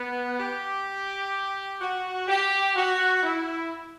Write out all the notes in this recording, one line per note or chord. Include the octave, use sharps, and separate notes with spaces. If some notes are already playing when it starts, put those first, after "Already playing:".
Already playing: B3
G4
F#4
G4
F#4
E4